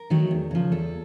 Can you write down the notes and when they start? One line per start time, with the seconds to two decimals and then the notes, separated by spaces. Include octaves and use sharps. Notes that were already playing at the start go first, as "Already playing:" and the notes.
Already playing: A#4
0.10 D#3 F#3 A3
0.31 E2
0.51 C#3 F3
0.72 E2 A4